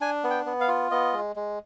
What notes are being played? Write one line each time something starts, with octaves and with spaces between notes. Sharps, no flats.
D4 G#5
B3
G5
B3
F5
F4
B3 D#5
G#3
G#3